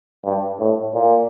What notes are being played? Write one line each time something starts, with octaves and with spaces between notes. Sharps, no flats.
G2
A2
A#2